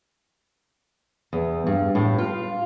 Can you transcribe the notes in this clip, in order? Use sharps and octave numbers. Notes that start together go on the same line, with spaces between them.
E2
G2
A2
F4